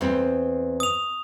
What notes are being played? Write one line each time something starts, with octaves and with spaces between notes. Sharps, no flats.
E2 C4
D#6 F7